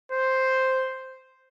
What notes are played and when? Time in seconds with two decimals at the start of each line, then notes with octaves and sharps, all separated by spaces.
0.12 C5